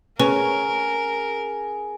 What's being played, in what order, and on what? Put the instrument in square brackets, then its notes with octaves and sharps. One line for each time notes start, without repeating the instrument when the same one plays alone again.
[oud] C#4 [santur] G#4 [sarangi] A#4 [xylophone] B4